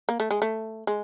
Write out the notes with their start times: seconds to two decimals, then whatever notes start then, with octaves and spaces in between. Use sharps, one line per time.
0.09 A#3
0.20 A3
0.31 G#3
0.42 A3
0.87 G#3